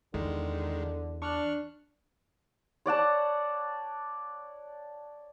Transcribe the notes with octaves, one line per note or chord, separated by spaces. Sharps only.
E2 D3 D#3 G#3
D4 C#6 F6 F#6
C#5 D5 F#5 A5